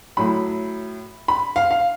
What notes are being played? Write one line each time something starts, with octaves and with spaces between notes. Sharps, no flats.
A2 F#3 B5
B5
F5
F5